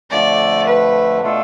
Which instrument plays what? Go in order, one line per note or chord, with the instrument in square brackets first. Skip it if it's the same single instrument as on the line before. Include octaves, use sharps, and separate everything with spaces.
[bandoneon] F2 D3 F3 A3 [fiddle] D5
[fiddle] B4
[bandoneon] B2 A3 D4 F4 A4